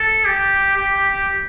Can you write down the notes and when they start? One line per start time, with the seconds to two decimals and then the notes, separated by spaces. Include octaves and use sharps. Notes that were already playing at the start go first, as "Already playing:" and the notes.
Already playing: A4
0.25 G4
0.76 G4